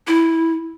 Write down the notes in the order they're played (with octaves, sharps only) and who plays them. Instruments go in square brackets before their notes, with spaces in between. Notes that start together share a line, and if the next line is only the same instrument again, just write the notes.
[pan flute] E4